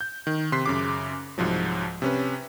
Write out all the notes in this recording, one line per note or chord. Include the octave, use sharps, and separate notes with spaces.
G6
D#3
C3 C6 F#6 B6 C7
F#2 C#3 D6
C2 G#2 F3 F#3
C3 C#4 B4